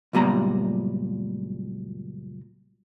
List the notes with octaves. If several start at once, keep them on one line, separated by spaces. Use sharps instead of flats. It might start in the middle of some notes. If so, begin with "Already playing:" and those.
C#2 F#2 A#2 G3 B3 A#5